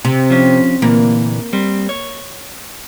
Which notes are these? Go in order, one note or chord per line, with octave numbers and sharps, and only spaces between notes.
C3
F3 C#4
A#2 D3 E3 A#3
G3 C4
C#5